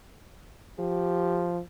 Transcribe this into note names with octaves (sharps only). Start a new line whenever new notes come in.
F3 G4